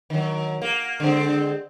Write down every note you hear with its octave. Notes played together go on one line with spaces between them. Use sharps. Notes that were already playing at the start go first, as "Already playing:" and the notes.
D#3 F#3
A#3
D3 G#3 C4